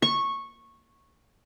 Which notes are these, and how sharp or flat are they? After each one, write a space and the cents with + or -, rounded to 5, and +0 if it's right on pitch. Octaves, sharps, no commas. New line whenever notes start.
C#6 -10